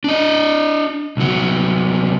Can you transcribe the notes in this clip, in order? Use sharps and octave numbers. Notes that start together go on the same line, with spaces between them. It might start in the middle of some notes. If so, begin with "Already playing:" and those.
D4 D#5
C2 F#3